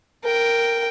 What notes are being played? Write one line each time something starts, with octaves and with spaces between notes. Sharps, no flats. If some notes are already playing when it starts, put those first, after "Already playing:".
A#4 G5